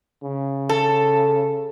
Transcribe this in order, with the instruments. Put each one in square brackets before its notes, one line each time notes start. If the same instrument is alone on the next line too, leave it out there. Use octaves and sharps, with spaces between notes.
[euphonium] C#3
[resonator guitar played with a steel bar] A4